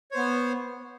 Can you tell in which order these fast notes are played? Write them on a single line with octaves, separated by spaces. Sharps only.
C#5 C5 B3